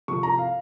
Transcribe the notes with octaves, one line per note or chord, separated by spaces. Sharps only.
C3 F3 C#6
A#5
F5